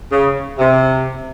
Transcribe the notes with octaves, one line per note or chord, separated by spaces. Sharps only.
C#3
C3